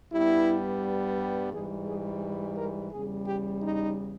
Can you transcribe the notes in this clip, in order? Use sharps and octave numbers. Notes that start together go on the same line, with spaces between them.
G2 G3 B3 E4
G#2 E3 G3 G#4
G#4
A#4
E2 C#3 G3 G#4
G4
D#4